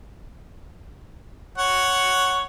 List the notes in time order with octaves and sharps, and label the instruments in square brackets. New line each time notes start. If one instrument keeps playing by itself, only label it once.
[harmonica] C#5 F#5